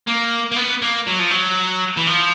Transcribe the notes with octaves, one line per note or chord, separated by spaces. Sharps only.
A#3
A#3
B3
A#3
F#3
F3
F#3
E3
F3